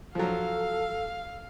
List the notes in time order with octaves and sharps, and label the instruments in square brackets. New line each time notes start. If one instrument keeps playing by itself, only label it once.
[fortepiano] F3 F#3 [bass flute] A4 [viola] F5